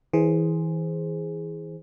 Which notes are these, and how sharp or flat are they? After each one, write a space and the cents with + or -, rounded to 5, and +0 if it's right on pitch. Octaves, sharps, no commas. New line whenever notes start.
E3 -25 G#4 +0 C5 +0